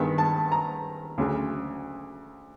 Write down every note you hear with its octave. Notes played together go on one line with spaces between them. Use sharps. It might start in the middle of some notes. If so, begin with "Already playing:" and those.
Already playing: G2 D#3 G#3 B3
A5
A#5
D2 C#3 F#3